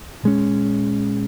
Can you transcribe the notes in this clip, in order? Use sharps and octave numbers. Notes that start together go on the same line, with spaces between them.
A#2 G#3 C#4